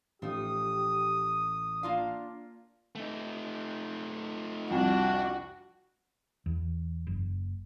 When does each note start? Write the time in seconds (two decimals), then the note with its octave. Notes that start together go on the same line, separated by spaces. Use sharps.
0.22 A1 F3 D#4 G4 D#6
1.83 A#3 D4 F4 F5
2.95 A3 D#4
4.71 C2 F2 D4 F#4 A5
6.46 E2
7.07 F#1